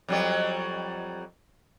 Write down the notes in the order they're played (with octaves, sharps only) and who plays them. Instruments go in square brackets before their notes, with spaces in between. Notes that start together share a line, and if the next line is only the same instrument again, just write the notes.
[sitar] F2 F#3 G3